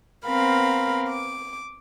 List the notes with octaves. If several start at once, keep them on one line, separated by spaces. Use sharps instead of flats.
B3 C4 A#4 F5 B5
D6